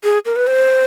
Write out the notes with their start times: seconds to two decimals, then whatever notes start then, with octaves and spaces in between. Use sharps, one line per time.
0.04 G#4
0.26 A#4
0.36 B4
0.47 C5